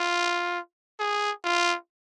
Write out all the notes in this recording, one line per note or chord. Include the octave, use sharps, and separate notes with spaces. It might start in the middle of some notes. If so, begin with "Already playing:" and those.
Already playing: F4
G#4
F4